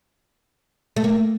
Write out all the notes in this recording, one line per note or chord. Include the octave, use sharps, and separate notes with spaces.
A3
A#3